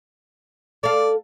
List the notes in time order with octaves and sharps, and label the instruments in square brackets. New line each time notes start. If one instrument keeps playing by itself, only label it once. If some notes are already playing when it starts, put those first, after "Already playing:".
[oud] A4 F5 [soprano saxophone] D5